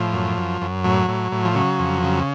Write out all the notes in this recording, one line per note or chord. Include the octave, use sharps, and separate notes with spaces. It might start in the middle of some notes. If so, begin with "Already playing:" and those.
Already playing: A2 F3
F#2
F#2
F#2
A2 F#3
A2
A2
F3
C#3 F#3
F2
C#3